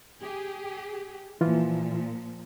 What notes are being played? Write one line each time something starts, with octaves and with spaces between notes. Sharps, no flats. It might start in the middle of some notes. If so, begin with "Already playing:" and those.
G4 G#4
A#2 E3 F3 F4